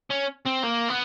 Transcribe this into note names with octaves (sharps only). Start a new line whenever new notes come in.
C#4
C4
A#3
B3